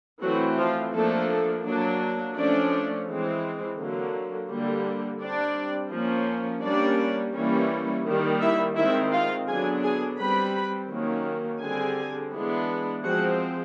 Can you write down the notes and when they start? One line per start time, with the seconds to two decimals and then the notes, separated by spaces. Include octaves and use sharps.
0.22 E3 F#3 A3 C4 F#4
0.58 F3 F4
0.94 F3 A3 A#3 D4 A4
1.65 F#3 A#3 D4
2.36 F3 A3 C#4 D4 D5
3.07 E3 G#3 C4
3.78 D3 F#3 A#3
4.50 D3 G3 A#3
5.21 G3 C4 D4 D5
5.92 F3 A#3 C#4
6.63 G3 A#3 C#4 D4 D5
7.34 E3 G3 A#3 C#4
8.05 D#3 G3 A#3
8.41 E4 E5
8.76 D#3 G#3 C4 E4 E5
9.12 F4 F5
9.48 D3 F#3 B3 D4 G#4 G#5
9.83 G#4 G#5
10.18 G3 C4 B4 B5
10.90 D#3 F#3 A#3 C#4
11.61 D3 G3 C4 G#4 G#5
12.33 E3 G#3 B3 D4
13.03 F3 G#3 C4 F#4 F#5